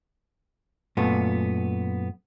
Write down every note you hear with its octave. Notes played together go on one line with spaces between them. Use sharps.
F#2 A#2 A3 B3